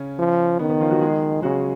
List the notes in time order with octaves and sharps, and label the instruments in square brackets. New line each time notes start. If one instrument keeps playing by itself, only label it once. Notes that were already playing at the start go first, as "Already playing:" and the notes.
Already playing: [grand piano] C#3 C#4
[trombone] F3
[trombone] D#3 [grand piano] B3
[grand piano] B3
F3 F4
F#3 F#4
G#3 G#4
[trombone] C#3 [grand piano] F#3 F#4